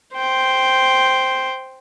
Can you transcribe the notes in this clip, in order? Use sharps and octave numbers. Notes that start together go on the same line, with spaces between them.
C5 G5